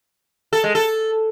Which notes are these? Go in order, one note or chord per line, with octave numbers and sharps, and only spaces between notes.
A4
G#3
A4